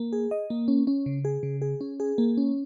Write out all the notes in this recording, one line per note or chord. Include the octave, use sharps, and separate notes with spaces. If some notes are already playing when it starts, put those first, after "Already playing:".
Already playing: A#3
G#4
D#5
A#3
C#4
C#4
C#3
G#4
C#3
G#4
C#4
G#4
A#3
C#4